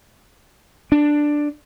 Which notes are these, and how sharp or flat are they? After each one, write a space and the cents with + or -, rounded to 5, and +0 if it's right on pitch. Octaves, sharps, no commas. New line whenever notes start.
D4 +5